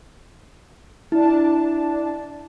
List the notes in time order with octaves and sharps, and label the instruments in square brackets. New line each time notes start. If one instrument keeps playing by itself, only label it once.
[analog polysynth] D4 A5 [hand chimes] E4